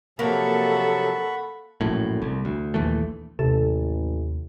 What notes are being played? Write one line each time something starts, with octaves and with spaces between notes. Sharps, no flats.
C3 F3 F#3 A#3 A4 F#5 B5 C#6
A#1 F#2 A2
C2
D2
A#1 D#2 E3 A3
A1 D#2 C3 A4